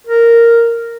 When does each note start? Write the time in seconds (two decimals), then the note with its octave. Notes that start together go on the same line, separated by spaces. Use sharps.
0.07 A#4